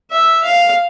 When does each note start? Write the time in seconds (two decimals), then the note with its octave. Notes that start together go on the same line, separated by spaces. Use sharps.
0.11 E5
0.44 F5